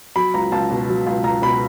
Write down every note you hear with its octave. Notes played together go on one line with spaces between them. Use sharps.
F#3 B5
C#2 A#5
C#2 A5
B2
F#3
C#2
C#2 A#5
B2 B5